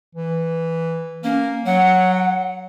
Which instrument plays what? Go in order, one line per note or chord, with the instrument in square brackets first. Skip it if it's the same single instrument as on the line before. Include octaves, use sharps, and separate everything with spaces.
[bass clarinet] E3
[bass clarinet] A#3 [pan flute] C#4
[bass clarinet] F#3 [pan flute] F#5